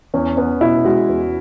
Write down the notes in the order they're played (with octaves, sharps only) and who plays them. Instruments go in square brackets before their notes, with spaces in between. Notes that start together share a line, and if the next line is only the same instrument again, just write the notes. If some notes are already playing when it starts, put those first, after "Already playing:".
[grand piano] E2 [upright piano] C#4
[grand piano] B3 [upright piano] C#4
[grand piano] B2 [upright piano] E4
[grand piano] G#3 [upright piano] F#4
[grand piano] E2